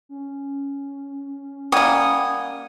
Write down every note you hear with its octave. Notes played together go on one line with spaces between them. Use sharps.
C#4
G3 A#3 F#5 G#5 D#6 G#6